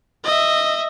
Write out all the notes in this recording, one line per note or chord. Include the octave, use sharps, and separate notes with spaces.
D#5 E5